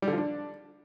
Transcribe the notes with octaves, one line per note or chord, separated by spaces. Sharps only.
G3
D3
F3
D4